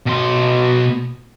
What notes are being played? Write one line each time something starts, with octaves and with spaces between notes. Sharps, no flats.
B2 C6